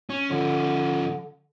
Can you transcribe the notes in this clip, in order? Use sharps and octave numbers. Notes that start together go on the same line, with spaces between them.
C#4
D3 F3 C#4